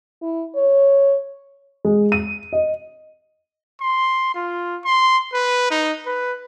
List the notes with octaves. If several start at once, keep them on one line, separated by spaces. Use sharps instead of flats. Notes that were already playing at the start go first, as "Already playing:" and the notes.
E4
C#5
G#3
D#7
D#5
C6
F4
C6
B4
D#4
B4